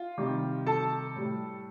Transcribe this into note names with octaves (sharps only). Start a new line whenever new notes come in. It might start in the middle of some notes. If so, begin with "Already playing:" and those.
Already playing: F4
C3 D#3 G3
A4 A5
A2 G3